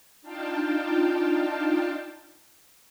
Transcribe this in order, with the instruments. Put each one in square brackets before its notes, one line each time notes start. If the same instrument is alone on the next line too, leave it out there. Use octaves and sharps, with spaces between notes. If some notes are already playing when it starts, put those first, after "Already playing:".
[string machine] D4 D#4 F4 F5 G5 A5